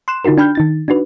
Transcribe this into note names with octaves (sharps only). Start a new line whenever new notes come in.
C6 F#6 E7
D3 D#4 F4 F#4 A#4
D4 G5 B5 F6 G6
D#3 D#4 A6
D4 D#4 F#4 B4